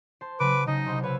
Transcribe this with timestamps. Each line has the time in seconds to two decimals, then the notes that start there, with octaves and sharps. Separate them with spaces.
0.21 C5 A5 C6
0.40 C#3 F#3 B4 D6
0.67 C#3 D#4 D#5
0.86 C2 C3 C5
1.03 B4 C#5 F5 E6